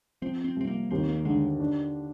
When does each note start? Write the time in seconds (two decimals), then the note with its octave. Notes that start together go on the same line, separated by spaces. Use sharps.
0.22 F3 C4
0.44 C4
0.56 C2 C4
0.67 A#3
0.91 D#2 C4
1.09 A#3
1.25 D3 G#3
1.60 D4